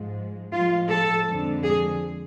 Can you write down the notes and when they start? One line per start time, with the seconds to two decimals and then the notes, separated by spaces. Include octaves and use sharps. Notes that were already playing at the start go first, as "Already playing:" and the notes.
Already playing: G#2 F3 G#3
0.53 A2 F3 G#3 F4
0.90 A4
1.26 F2 D3 G#3
1.64 G#4